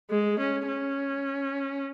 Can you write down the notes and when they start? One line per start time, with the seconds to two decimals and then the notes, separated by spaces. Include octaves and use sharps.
0.11 G#3
0.40 C#4
0.68 C#4